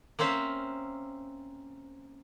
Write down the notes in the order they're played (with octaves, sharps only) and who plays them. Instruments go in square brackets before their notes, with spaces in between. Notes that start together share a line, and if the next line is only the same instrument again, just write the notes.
[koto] A#3 C4 C#4 C5 E5 F5